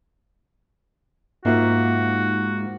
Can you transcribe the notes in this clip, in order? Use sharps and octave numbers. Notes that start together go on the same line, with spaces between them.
G#2 A#3 F4 F#4 E5